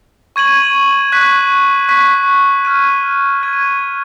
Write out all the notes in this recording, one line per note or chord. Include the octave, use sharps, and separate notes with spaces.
C#6 G#6 D#7 F#7
C#6 F#6 B6
C#6 F#6 B6
F6 G#6 D#7
F6 G#6 D#7